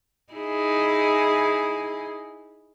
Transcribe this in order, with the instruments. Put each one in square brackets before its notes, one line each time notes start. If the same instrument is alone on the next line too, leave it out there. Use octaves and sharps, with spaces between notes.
[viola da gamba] D#4 E4 G#4